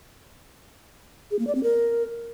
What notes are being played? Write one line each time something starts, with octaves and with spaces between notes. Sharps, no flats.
G#4
A#3
D5
C4
A#4